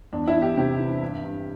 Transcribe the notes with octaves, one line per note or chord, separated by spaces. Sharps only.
E2 D4
E4
E2
G4
C3 G4
E3
G2
G2